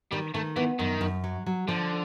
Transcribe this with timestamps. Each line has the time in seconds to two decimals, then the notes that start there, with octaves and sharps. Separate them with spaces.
0.11 D#3 G3
0.34 D#3 A3
0.56 E3 B3
0.79 F#2 D#3
1.01 F#2
1.24 F#3
1.46 F#3
1.68 D3 F3